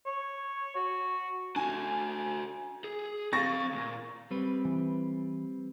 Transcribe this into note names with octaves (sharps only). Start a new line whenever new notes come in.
C#5
F#4
D4 F#4 G#5
G#4
C4 F5 C#6 A6 A#6
D2 A#2
G3 C4 B4
E3